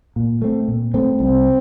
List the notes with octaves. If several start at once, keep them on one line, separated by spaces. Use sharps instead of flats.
A#2
A3 C4
A#2
A3 C4
C2 C4